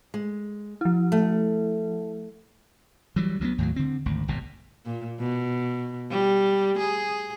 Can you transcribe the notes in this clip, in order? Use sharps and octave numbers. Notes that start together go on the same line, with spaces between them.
G#3
F3 E4
A3
E3 F#3 G3
D2 F#3 A3 B3
D#2 A2 F#3
D3 C4
G#1 D2
G1 B2
A#2
B2
G3
G#4